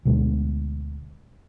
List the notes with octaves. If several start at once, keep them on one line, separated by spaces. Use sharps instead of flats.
D2 B2 G#3